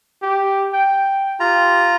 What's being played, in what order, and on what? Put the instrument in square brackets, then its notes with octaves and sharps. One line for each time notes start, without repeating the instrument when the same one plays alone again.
[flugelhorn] G4
G5
[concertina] F4 A#5 [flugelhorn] G4